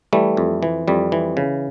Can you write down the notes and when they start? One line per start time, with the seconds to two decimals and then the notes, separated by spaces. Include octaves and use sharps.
0.13 E3 G3 A3
0.37 F2
0.63 E3
0.88 F2 G3
1.12 E3
1.37 C#3